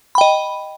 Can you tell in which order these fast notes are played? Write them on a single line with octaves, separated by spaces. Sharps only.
B5 G5 D#5